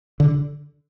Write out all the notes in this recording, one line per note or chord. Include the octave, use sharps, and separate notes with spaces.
D3